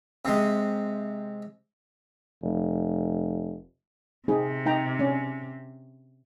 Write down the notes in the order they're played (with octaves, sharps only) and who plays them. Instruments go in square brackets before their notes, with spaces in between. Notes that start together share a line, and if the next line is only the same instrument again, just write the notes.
[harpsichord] C3 G#3
[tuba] F1
[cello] C3 [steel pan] C4 D#4 G#4
[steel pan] D#4 G5 A#5
C#4 D4 D5